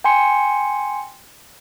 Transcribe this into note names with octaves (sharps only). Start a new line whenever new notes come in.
G5 G#5 C6 C#7